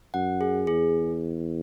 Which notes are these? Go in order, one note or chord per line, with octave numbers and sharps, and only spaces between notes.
F#2 F#5
G#4
E2 G#4